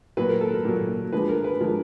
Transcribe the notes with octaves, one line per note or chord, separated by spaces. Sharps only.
A#2 F#3 B4
A#4
A4
A#4
A#2 F#3
D3 F3 G#3 B4
A#4
B4
D3 F3 G#3 A#4